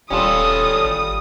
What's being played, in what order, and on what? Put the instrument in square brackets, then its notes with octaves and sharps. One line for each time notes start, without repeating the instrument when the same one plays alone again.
[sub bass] D#1 [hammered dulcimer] G3 F4 [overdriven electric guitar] C#4 A4 [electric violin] D#6
[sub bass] G#1